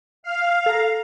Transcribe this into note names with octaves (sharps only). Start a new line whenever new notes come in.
F5
A4 A#5